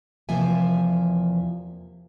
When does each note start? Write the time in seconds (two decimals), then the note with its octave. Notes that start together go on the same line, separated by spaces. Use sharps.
0.29 E2 C3 F3 A#3 E5 G#5